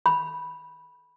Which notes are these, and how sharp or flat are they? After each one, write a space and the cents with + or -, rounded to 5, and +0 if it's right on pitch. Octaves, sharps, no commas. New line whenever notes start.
B5 -10